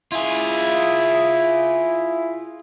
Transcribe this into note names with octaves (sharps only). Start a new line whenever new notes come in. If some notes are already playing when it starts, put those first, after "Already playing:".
E4 F4 G#4